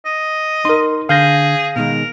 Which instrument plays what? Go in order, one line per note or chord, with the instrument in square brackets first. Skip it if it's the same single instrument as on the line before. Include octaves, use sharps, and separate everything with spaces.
[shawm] D#5
[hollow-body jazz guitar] D#4 [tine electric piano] A#4 C6
[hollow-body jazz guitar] D3 [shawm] G#4 [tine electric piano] F5 G6 A#6
[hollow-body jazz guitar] B2 D#3 G#3 [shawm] A#4